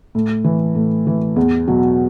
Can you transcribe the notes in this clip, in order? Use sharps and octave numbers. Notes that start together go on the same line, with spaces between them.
A2
E3
A2
E3
E2
B2 F#3